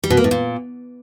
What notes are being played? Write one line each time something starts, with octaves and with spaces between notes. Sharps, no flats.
G3
B2
A#3
A2
A#2